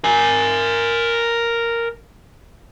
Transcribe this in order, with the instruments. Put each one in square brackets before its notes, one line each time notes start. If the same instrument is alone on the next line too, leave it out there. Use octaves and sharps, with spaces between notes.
[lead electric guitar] A#4 G#5